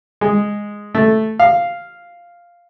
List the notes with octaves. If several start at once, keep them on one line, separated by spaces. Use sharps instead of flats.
G#3
A3
F5